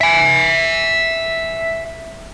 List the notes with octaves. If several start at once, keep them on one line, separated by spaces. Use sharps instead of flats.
E5 G#5